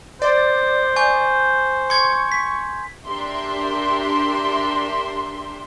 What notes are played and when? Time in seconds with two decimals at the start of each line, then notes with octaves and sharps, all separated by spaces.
0.22 C5 D5
0.96 G#5 C#6 G6
1.90 C6 C#6 G#6
2.32 B6
3.06 D4 G4 A#4 E5 C6